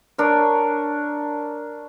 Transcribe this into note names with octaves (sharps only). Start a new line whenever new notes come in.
D4 A#4 C#5